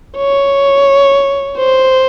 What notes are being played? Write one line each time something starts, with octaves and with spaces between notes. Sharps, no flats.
C#5
C5